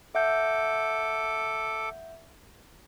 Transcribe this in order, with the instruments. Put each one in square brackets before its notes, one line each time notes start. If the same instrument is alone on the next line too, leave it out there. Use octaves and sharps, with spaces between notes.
[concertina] A4 D6 [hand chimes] E5 F#5 G6